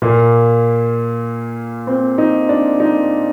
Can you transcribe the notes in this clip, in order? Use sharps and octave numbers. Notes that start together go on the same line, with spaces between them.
A#2 A#3
C4
D#4
D4
D#4